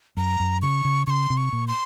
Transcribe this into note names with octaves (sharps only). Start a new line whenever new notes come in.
F#2 A#5
F#2
C#3 C#6
C#3
C#3 C6 C#6
C3
C#6
A#2
C6